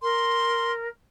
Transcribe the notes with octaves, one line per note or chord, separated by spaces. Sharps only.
A#4 C6